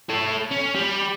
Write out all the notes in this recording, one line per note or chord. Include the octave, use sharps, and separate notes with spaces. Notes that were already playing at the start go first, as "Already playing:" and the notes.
A4 C#5
C#4
G3